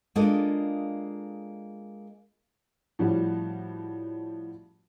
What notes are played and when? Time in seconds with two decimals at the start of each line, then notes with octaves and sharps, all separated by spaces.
0.15 G#3 A#3 D4 F4 A4 D#5
2.99 A2 F3 G3 C#4 F#4